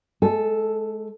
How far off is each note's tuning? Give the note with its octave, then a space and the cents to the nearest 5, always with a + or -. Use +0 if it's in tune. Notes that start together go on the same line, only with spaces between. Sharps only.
G#3 +35 A4 +0 G#5 +15